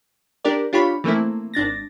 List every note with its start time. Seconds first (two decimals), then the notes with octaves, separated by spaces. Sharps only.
0.45 D4 G4 A#4 D5
0.73 D4 F4 G4 C#5 B5
1.04 E3 A3 A#3 C4 E4
1.54 G#1 D4 A6 A#6